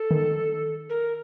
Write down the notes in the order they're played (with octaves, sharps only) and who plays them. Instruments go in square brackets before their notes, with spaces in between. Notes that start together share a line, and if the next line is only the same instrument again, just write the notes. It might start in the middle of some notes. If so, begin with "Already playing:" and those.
Already playing: [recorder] A4
[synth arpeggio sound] D#3
[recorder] A#4